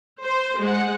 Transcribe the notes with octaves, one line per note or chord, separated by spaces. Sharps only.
C5
G#3 F#5